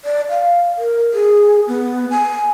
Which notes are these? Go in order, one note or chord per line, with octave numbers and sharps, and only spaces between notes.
D5
F5
A#4
G#4
B3
G#5